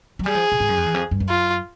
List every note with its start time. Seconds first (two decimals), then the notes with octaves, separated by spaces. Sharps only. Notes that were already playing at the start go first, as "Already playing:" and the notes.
0.19 F#3
0.26 G3 G#4
0.35 F3
0.52 B2
0.60 G#2
0.69 F#2
0.78 F2
0.86 E2
0.94 F2
1.11 G2
1.20 F#2
1.29 F4